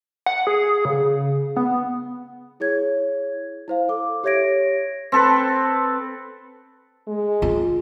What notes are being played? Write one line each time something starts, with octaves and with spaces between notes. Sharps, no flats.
F#5
G#4
C#3
B3
E4 G#4 C#5 G#6
E4 C5 F5
A4 D6
G4 C#5 E5 G#6 A#6 D7
C4 A4 B4
G#3
F4